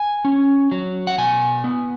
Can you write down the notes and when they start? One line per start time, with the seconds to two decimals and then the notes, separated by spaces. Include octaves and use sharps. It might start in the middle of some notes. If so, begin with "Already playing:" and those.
Already playing: G#5
0.25 C#4
0.72 F#3
1.07 F#5
1.18 B2 G#5
1.64 B3